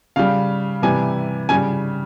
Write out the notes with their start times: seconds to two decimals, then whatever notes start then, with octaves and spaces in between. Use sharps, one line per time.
0.16 C#3 G3 F5
0.82 C3 E3 G3 G#5
1.49 C#3 G3 G#5